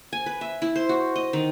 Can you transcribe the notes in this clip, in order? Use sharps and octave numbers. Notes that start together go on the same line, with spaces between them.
G#5
B4
E5
E4
C5
F#4
D#5
D#3